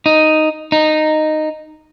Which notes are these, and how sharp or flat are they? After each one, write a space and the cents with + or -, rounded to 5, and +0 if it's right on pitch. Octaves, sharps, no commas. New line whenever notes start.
D#4 +0
D#4 -10